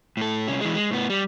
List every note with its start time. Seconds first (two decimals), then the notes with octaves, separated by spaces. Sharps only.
0.17 A2 A4
0.47 C2 C#4
0.61 E3 G#3
0.75 G#3
0.91 A2 B3
1.10 G3